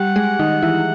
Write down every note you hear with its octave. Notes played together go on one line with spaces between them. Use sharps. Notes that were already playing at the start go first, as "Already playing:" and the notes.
Already playing: G3 G4 F#5
G#3 G#4
D#3 D#4
E3 E4